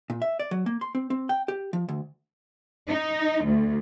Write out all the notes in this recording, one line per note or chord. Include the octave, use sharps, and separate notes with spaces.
A#2
E5
D5
F#3
A#3
C6
C4
C4
G5
G4
F3
D2
D#4
D2